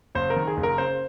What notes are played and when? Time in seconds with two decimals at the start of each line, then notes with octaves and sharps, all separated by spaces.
0.15 F#1 C5
0.30 A#4
0.36 D#3
0.47 G#4
0.57 F#1
0.63 A#4
0.78 C#3 C5